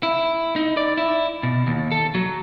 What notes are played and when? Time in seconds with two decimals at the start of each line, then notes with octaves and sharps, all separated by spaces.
0.03 E4
0.56 D#4
0.77 D5
0.97 E4
1.43 B2
1.67 D#2
1.92 A4
2.15 F#3